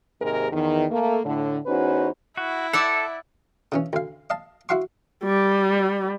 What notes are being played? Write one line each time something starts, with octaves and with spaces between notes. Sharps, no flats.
D#2 G#2 C3 G#3 G#4 A#4
E2 D#3
A3 A#3
A2 D3
E2 C#4 D#4 F#4 B4 C5
E4 F#4
A4 D5 E5 F#5
C#3 E3 C#4
D2 F5
D#5 F5 A5
E4 F#4 F5 F#5 C6 C#6
G3